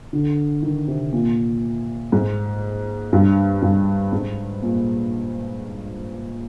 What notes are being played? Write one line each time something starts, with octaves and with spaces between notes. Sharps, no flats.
D3
D#3
C3
A#2
G#2
G2
G2
G#2
A#2